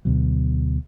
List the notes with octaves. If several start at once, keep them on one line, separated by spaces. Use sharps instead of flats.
D2 B2 F#3